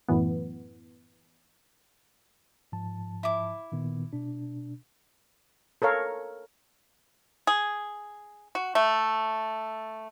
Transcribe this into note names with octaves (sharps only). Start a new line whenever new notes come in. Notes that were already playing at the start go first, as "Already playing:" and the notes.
F#2 A2 E3 B3
G#2 F3 A5
E4 D6
A#2 D#3 B3
B2 D4
A4 A#4 C#5 F5
G#4
F#4
A3